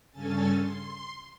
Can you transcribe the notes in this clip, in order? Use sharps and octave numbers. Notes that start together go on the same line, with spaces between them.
G2 C#3 C#4 A4 G#5 A6
C6